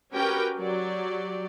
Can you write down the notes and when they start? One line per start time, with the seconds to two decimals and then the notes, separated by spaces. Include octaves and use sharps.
0.14 C#4 F#4 G4 A#4 B4 G5
0.59 F#3 G4 D5